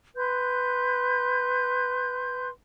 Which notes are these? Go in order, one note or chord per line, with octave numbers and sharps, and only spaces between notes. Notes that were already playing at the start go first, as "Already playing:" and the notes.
B4 C6 F#6 G6